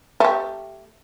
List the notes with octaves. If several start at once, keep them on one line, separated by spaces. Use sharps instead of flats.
A3 G4